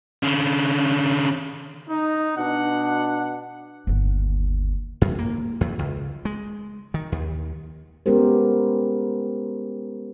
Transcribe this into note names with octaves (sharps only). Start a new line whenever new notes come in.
D3 C#4
D#4
B2 D4 F#5
G1 D#2
F#2
A#3
E2
C#2
G#3
D#3
D#2
G#3 B3 C#4 G4 A#4 C5